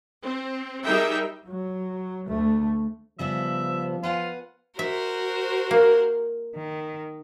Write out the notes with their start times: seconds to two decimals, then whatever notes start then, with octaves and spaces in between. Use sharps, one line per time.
0.22 C4
0.84 G3 D#4 G#4 A#4 E5 G5
1.46 F#3
2.27 D2 A3
3.19 C#3 F3 G3 B3 E5
4.03 F4 B4 F#5 G#5
4.79 F#4 A#4 C5 E5
5.71 A#3
6.56 D#3